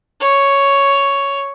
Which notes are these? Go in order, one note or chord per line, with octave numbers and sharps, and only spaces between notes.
C#5